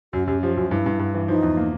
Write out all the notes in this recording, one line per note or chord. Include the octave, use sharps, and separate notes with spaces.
F#2 F#4
F#2 G4
F3 G4
F#2 F#4
G2 E4
G2
G2
E3
F3 D#4
E2
A#3